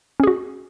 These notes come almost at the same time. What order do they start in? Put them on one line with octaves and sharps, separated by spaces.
C#4 G#4 F#4